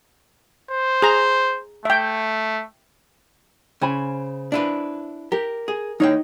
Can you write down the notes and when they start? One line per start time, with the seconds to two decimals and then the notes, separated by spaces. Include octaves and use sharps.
0.71 C5
1.02 G#4 A#5
1.85 A3 E5 G5
3.81 C#3 C5 G#5 B5
4.52 D4 E4 B4
5.32 G4 A#4
5.68 G#4
6.00 D#2 D#4 C#5 G5